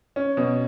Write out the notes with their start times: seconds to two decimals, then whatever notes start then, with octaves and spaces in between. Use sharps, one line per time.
0.16 C#4
0.37 B2